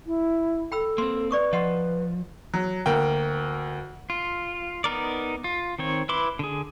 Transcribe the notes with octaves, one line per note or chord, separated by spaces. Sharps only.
E4
A4 G5 B5 E6
A#3 C4 C6
B4 D5 C#6 D#6
F3 D#5 F#5 C6
F#3
D2 A#3 G5
F4
B3 D#4 A#4 D5
F4
D#3 C4 C#5
E4 B4 B5 C6 D6
D3 G#4